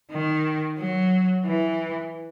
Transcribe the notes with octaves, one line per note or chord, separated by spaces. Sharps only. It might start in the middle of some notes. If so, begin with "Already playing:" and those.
D#3
F#3
E3